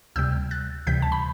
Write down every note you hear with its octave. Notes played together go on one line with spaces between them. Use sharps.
D2 C3 G3 E6 G6
F#6 A6
D2 C3 E3 G3 G6 B6
A5
B5